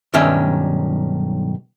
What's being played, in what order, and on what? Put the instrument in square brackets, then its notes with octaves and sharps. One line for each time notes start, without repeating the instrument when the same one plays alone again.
[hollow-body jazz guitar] B1 G2 D#3 C#4 E5